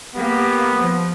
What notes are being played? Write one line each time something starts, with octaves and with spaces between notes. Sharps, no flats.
A#3 B3 G4
F3